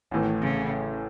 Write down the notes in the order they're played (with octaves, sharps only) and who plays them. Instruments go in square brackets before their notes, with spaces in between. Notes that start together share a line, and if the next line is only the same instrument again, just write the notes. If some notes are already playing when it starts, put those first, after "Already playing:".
[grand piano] A1 A2 E3 [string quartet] D#3
[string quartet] C#3